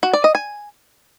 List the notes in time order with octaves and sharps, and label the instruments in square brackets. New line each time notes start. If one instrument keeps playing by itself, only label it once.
[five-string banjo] F#4
D5
D#5
G#5